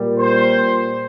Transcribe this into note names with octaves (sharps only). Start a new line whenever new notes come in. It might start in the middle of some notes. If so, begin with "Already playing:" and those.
Already playing: A#2 G3
C5